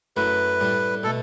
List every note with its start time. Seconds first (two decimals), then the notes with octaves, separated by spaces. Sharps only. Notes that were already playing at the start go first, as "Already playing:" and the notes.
0.16 F#2 F#3 A3 E4 B4
0.60 A2 G3 D4
1.03 B2 A3 A4